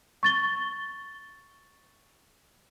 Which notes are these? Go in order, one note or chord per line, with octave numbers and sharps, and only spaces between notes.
C#6 A6 G7